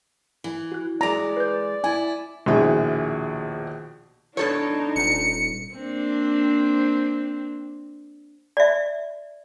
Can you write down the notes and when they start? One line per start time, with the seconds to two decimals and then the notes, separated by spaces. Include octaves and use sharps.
0.44 E3
0.72 F#4 F#6
1.01 E3 G#3 D5 A#5
1.37 B4 G6
1.84 E4 G#5
2.46 A#1 D#2 B2 E4 G#4
4.37 B2 D4 D#4 A4 C#5
4.96 D#1 C#7
5.72 A#3 C4 D4
8.57 D5 E5